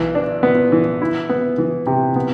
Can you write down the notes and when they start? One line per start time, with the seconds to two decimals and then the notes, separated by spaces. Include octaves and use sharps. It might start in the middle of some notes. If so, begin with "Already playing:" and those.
Already playing: B1 E3
0.15 D4
0.43 B3
0.72 E3
1.02 E4
1.29 B3
1.58 E3
1.87 C3
2.16 B3